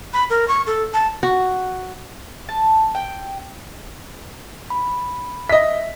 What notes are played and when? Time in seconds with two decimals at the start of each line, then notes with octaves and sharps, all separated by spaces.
0.13 B5
0.30 A#4
0.48 C#6
0.67 A4
0.94 A5
1.23 F#4
2.49 A5
2.95 G5
4.70 B5
5.49 D#5 E5 B6